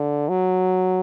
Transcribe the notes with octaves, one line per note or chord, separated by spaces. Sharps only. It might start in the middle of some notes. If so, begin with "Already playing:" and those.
Already playing: D3
F#3